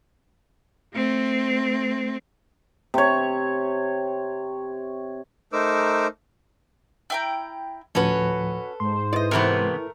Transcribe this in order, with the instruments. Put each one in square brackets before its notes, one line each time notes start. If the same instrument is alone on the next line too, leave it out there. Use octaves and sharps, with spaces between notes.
[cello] A3 C4
[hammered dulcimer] C3 C#5
[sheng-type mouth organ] A3 D#4 A#4 C5 D6 E6
[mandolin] E4 G5 A#5
[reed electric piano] D2 A2 F3 [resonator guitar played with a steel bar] C#4 F#4 [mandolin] A4 B4
[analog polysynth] G#2 C5 [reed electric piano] C6
[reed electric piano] E4 B4 [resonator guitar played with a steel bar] D5 D#5
[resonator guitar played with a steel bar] C3 E3 B3 [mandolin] A3 A#4